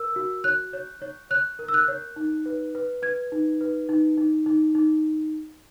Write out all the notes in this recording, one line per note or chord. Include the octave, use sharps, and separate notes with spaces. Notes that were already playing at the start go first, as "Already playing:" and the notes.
Already playing: A#4 E6
F#4
C#5 F#6
C#5
C#5
C#5 F#6
A#4
E6
F#6
C#5
D#4
B4
B4
B4 G#6
D#4
B4
D#4
D#4
D#4
D#4